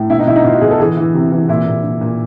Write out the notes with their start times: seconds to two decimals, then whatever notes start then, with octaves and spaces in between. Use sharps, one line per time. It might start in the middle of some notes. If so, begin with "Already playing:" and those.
Already playing: A2
0.10 B2 E4
0.19 D#4
0.27 B2 E4
0.36 D#4
0.44 B2 F4
0.54 F#4
0.61 B2 G#4
0.71 A4
0.80 E3 G#4
0.97 E3
1.14 C3
1.32 E3
1.49 A#2 E4
1.66 A#2
1.84 A#2
2.01 A#2